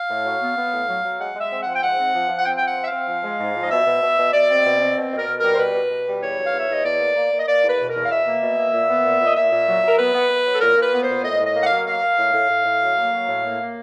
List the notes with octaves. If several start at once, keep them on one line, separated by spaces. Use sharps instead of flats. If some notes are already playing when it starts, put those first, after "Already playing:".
Already playing: F5
A2
F#3
B3
B3
A2
F#3
F#3
G#3 F#5
G#3
E5
C4
F3 F#5
G5
G#2 F#5
C4
F3
F3
F#5
C4 G5
F3 G5
F#5
C4
E5
F5
C4
F3
G#3
G#2
F3
D#5
B2 E5
B2
B2
B2
B2 D5
C4
B2
C4
B2
B2
A#4
B2
A#4
G3
C5
B2 B4
B2
B2
G3
E2 C#5
F#3
F5
E2
E5
E2 D#5
E2 D5
A#3
A#3
A#3
D#5
A#3 D5
E2
B4
B2
A#4
E2
F5
B2 E5
A#3
B2
A#3
A#2
B3
A#2
A#2 D#5
A#2 E5
A#2
F#3
F#3 A#4
B3 B4
B3
B3
F#3
A4
A#2 A#4
A#2
B4
B3
C5
A#2
A2 D#5
A2 D#5
A#3
F#5
F5
F#3
A#3 F5
A#3
A2
A2
A2
A2
F#3
A#3
F#3
A2
A#3
A#3